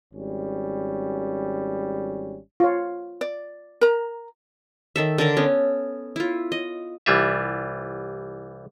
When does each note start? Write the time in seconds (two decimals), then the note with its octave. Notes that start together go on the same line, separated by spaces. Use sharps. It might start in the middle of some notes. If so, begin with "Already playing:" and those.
0.14 G#1 G3 C#4
2.60 F4 C#5
3.21 D5
3.81 A#4 A#5
4.96 D#3 A4 E5
5.18 D3 A4 A#4
5.37 B3 C#4
6.16 E4 F4
6.52 D#5
7.06 C2 E3 G3 F4 E5